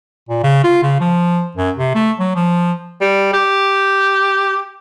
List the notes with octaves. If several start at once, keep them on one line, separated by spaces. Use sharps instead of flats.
A#2
C#3
F4
C#3
F3
F#2
C3
A3
F#3
F3
G3
G4